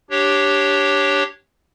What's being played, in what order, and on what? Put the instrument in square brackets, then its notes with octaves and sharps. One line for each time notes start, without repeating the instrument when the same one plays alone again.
[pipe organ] D4 G4 C#5